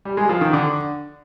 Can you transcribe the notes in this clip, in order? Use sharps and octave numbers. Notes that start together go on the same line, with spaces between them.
G3
G#3
F3
D#3
D3